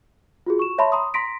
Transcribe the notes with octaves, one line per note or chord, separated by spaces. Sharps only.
F4 F#4 G#4
C#6 E7
C#5 E5 A5 B5 C6
A#5 C6 D#6
A#5 C6 A#6 B6 D7